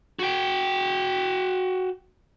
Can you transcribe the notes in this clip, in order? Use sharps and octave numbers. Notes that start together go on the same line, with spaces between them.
F#4 G5